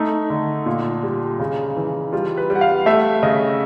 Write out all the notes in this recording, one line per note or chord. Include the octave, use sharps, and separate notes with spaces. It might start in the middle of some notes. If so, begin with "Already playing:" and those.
Already playing: A3 D#4
D3
A#2
G3
C#3
E3
G3 F4
B4
G3
F#5
F5
A3 E5
C#3 D#5